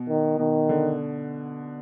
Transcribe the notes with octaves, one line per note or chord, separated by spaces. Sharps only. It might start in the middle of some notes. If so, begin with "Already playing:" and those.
Already playing: B2
D#3
B2 D#3
D3